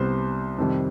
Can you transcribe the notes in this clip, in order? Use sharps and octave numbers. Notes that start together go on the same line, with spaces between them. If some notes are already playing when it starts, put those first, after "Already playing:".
Already playing: C2 C3 G3 B3 C5
F2 C3 D#3 G3